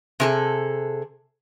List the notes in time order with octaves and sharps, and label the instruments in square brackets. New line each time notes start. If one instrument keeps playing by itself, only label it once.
[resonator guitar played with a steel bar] C3 G#4 A4